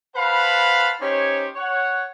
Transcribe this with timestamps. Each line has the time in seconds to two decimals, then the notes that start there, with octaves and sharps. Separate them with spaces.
0.15 B4 C5 F5 F#5 A5 B5
1.01 C#4 D#4 G4 C5 C#5
1.55 C#5 F#5